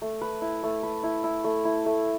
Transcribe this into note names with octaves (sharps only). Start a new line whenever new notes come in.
A3
B4
E4
A3
B4
E4
E4
A3
E4
A3